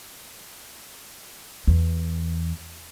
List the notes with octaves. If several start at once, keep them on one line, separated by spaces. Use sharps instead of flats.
E2